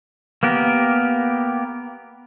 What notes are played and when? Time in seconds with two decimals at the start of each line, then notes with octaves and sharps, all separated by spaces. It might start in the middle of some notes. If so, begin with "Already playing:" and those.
0.43 A#3 B3 G4 A#4